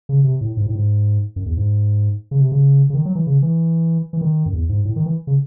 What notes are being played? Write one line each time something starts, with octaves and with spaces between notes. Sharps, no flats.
C#3
C3
A2
G#2
A2
G#2
F#2
E2
G#2
C#3
C3
C#3
C#3
D#3
F#3
E3
C#3
E3
E3
D#3
F#2
E2
G#2
A2
D#3
E3
C#3